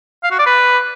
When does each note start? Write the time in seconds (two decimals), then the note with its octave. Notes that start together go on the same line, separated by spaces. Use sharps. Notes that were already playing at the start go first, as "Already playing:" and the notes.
0.24 F5
0.31 F#4
0.39 D5
0.46 B4